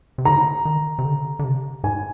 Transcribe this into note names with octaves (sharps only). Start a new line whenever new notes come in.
C3
D3 A#5
D#3
C3
D3
D3
C3
G#2 G#5